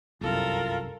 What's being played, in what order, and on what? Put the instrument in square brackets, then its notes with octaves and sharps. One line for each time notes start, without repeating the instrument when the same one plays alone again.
[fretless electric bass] G1 C2 F#2 [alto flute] F4 [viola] A4 A#4